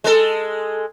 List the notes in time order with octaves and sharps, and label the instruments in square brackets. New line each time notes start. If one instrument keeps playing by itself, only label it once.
[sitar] G#3 A4